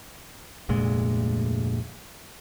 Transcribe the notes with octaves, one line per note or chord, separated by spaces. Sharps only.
F1 D2 A#2 G#3